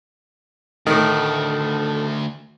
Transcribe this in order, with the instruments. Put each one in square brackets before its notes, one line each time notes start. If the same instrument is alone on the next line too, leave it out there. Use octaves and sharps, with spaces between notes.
[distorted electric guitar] D2 [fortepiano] A2 D#3 [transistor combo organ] A4